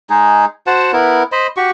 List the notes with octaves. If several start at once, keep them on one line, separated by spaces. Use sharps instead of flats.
G#3 D#4 G#4
F#4 C5 F#5 A5
B3 E4 A#4
C5 D#5 B5
F#4 G4 C#6